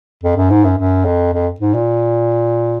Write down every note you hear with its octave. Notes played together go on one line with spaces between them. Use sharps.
F2
F#2
G#2
F#2
F#2
F2
F2
G#2
A#2